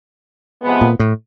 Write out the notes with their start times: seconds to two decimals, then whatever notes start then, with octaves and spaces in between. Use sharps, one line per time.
0.62 C3 F3 G#3 B3
0.81 A#2
0.99 A2